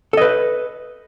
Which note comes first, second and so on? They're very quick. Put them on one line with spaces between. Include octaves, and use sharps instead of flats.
A4 D#5 B4